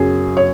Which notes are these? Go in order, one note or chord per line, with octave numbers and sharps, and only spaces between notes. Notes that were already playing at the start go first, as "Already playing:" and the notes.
Already playing: F#2 C#3 F#3 G#4
C#5